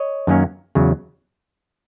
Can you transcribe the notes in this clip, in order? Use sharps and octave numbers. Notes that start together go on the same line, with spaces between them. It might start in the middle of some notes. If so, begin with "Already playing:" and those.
Already playing: C#5 D#5
F#2 D#3 F#3 A#3 C#4
E2 C#3 F#3